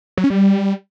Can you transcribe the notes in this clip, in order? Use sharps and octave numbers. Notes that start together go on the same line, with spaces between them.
F#3
C#4
G3